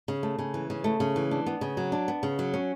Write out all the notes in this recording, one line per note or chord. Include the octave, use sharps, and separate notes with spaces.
C#3
A3
C#3
E3
C#3
A3
C#3
E3
D4
B3
C#3
F#3
D4
B3
C#3
F#3
C#4